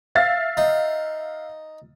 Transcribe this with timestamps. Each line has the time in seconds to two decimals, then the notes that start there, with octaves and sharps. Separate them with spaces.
0.15 E5 F5 A6
0.57 D#4